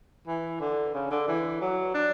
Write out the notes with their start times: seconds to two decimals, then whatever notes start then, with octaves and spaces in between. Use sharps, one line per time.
0.28 E3
0.60 D3
0.94 C#3
1.11 D3
1.28 E3
1.61 F#3
1.94 D4